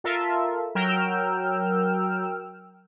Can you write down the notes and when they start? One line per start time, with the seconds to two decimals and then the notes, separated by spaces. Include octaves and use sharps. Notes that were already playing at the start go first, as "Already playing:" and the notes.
0.04 F4 A4 A#4 E5
0.75 F#3 A#4 G5 E6 F6